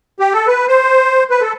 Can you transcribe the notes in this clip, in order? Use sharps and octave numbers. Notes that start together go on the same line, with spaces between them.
G4
A4
B4
C5
B4
A4